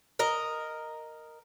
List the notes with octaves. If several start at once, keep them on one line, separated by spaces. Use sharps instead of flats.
A#4 D#5